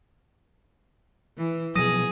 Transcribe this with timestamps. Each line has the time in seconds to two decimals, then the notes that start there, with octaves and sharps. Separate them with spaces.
1.38 E3
1.75 B2 F3 F#3 G#4 D#6 A#6 D#7